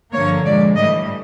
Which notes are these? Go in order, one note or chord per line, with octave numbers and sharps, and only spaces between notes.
G2 D3 F3 A#3 C#5
A#2 F3 G#3 D5
A2 E3 G3 D#5